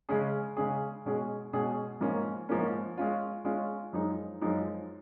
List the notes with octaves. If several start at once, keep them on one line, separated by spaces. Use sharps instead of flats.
C#3 G#3 C#4 G#4
C#3 G#3 C#4 G#4
B2 G#3 C#4 G#4
B2 G#3 C#4 G#4
G#2 F3 A#3 C#4
G#2 F3 A#3 C#4
G#3 C#4 F4
G#3 C#4 F4
F#2 F3 G#3 D#4
F#2 F3 G#3 D#4